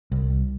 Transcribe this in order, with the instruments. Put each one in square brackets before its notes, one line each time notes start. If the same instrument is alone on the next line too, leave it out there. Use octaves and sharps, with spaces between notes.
[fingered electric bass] C2